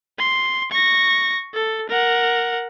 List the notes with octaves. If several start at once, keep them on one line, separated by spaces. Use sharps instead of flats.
C6
C#6 A#6
A4
A#4 F#5